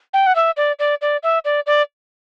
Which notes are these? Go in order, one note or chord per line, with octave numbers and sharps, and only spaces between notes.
G5
F#5
E5
D5
D5
D5
E5
D5
D5